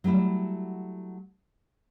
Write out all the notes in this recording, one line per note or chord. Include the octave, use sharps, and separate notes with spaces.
F#3 G3 A3 E4 F#4